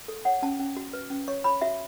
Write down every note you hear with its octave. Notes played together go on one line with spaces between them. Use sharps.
A4
C#5 F#5
C#4 A5
C#4
F#4
B4
C#4
C#5 C#6
C#5 B5
F#4 E5